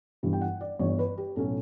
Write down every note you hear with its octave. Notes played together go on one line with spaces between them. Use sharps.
G1 G2 E3 G3
G5
F#5
D5
G1 G2 E3 G3 C#5
B4
G4
B1 A2 F#3 C#4 A4